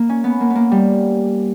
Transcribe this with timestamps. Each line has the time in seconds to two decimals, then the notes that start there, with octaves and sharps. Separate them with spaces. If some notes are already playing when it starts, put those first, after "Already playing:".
Already playing: A#3
0.09 C#4
0.24 B3
0.40 A#3
0.50 B3
0.55 A#3
0.72 G3